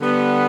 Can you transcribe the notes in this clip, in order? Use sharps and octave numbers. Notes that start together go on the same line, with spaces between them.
D3 G3 B3